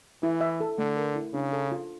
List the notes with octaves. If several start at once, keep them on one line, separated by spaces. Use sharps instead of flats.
E3 E4
E5
A4
D3 A3
A#4
E4
C#3 D4
A4
F4